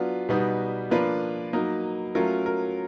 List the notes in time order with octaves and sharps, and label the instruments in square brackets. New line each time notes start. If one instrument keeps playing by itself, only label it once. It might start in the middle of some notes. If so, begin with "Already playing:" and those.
Already playing: [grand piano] F#3 B3 D4 F4
B2 G3 B3 D#4
F3 A#3 D4 F4 B4
F#3 A#3 D#4
F#3 A3 C#4 F4 A#4
A#4